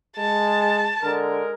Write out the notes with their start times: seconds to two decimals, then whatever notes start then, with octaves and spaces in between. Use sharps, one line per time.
0.17 G#3 A5
1.03 D3 G#3 A#4